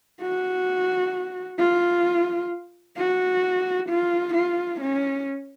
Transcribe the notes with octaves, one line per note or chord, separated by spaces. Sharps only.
F#4
F4
F#4
F4
F4
C#4